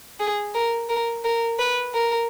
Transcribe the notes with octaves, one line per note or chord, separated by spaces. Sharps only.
G#4
A#4
A#4
A#4
B4
A#4